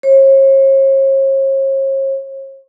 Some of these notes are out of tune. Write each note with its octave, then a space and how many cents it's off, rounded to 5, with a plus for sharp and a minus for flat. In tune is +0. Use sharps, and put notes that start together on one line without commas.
C#5 -45